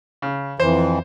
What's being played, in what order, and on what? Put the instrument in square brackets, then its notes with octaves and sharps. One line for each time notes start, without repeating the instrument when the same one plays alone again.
[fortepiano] C#3
[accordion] F2 E3 [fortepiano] C5